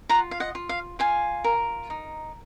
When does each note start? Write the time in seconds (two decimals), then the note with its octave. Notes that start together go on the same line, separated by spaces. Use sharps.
0.09 F4 F#5 A#5
0.31 F5
0.40 D#5 F#5
0.55 F4
0.69 F5
0.99 F4 F5 G#5
1.44 A#4
1.90 D#4